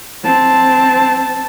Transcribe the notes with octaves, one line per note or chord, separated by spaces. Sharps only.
C4 A5